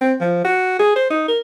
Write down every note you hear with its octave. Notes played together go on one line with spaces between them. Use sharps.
C4
F3
F#4
G#4
C5
D#4
A#4